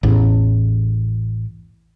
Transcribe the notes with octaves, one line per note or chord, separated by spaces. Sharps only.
A1 E2